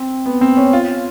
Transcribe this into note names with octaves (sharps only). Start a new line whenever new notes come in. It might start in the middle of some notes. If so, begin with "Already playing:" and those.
Already playing: C4
B3
C4
C#4
F4